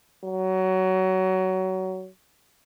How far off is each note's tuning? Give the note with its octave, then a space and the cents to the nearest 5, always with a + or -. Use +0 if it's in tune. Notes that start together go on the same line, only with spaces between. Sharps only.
F#3 +20